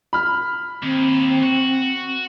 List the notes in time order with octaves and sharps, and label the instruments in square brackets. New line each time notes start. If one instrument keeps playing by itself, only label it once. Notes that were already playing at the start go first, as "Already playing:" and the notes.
[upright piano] B5 F6
[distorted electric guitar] D#2 [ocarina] C4
[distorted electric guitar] F#4